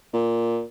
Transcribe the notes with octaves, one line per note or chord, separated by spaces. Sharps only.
A#2